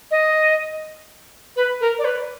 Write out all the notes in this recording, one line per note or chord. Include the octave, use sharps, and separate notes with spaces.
D#5
B4
A#4
D5
B4